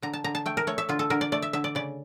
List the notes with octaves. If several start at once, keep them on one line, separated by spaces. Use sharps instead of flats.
D3 A#5
A5
D3 A#5
A5
A3 G5
A#4
A3 C#5
E5
D3 F4
A4
D3 A#4
D5
A3 D5
E5
D3 E5
D5
C#3 D5